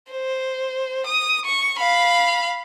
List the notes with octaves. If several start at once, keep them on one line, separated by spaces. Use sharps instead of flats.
C5
D#6
C#6
F5 B5